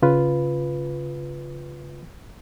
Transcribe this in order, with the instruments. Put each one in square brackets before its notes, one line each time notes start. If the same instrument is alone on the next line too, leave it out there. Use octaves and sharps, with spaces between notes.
[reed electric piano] C#3 F4 B4